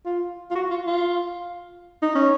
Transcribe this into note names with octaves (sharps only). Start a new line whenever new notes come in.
F4
F4
F#4
F4
F4
D#4
C#4